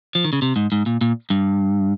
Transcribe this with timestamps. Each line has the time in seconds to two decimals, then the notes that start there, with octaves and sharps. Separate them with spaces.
0.15 F3
0.24 D#3
0.33 C#3
0.42 C3
0.56 G#2
0.72 G#2
0.86 A#2
1.01 A#2
1.30 G2